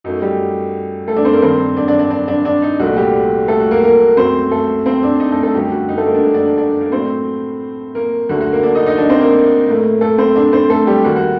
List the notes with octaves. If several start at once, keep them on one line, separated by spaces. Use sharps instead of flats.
F#2 F#3 A3 D#4
G3 G4
A3 A4
D4 D5
C4 C5
A#3 A#4
G2 D#3 G3 C4 C5
D4 D5
D4 D5
D4 D5
D4 D5
D4 D5
D4 D5
D#4
C2 A#2 A3 F#4
G3 G4
A3 A4
F#4
A#3 A#4
A#3 A#4
F#2 F#3 A3 C4 C5
A3 A4
C4 C5
D4 D5
D#4 D#5
A3 A4
A3 A4
F#2 D3 F#3 G3 A3 G4
F#4
D#4
A3 A4
A#3 A#4
D4 D5
A#3 A#4
D4 D5
D4 D5
D4 D5
A#3 A#4
A2 F#3 A3 C4 C5
A#3 A#4
D2 D3 A3 F#4
F#4
A#3 A#4
D4 D5
D#4 D#5
D#4 D#5
D4 D5
C4 C5
A#3 A#4
A2 A3
A3 A4
C4 C5
D4 D5
C4 C5
A3 A4
G3 G4
D#2 D#3 G3 F#4
F#4